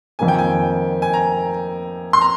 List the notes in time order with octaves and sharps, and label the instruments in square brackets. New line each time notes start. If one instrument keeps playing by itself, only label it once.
[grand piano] F2 D#3 A#3 [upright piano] G#5
[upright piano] G5
G#5
G#5
A#5
C6
A#5